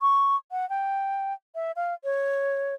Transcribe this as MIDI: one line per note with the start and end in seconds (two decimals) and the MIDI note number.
0.01 0.36 85
0.52 0.68 78
0.70 1.34 79
1.55 1.72 76
1.76 1.94 77
2.04 2.75 73